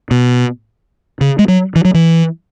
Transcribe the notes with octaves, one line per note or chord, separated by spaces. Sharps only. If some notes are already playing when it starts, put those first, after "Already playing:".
B2
C#3
G#3
F#3
E3
F#3
E3